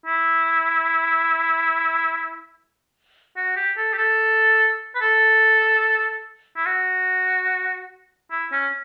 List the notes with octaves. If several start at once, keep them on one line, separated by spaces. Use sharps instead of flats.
E4
F#4
G4
A4
G4
A4
B4
A4
E4
F#4
E4
C#4